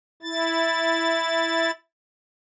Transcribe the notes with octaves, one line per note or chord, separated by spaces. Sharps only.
E4 A6